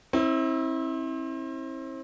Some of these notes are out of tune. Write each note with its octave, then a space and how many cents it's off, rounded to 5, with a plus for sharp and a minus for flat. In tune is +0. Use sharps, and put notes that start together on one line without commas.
C4 +35 E4 -25